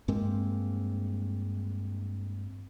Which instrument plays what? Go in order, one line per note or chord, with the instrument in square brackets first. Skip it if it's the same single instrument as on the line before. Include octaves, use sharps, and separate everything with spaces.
[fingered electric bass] G2 G#3 A#3 C4